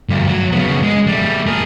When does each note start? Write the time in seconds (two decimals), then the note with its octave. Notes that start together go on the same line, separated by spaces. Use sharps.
0.09 D2 G2
0.28 F#3
0.52 C#3 B3
0.82 G#3
1.07 G3 A3
1.47 G#4 A#4